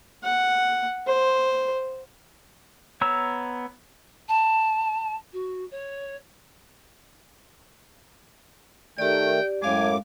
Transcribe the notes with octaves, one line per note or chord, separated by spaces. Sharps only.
F#5
C5
B3 C#5 A#5 E6
A5
F#4
C#5
D#3 A3 G4 D5 G5
F#2 A2 G#3 F5 G#5 D6